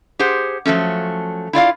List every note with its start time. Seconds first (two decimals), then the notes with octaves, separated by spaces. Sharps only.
0.19 G4 G#4 C5 F#5
0.66 F3 F#3 A3 C#4
1.53 E4 F4 D5 F5